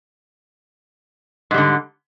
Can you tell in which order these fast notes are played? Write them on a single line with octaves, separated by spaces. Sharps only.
G#2 G3 D3